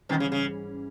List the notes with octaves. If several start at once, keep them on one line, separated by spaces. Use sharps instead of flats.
G#2 B2 D#3 E3 G3 C#4
C#3
C#3